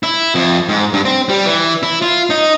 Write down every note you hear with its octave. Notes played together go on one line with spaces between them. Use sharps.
E4
F2
G#2
G2
C4
G3
E3
E4
F4
D#4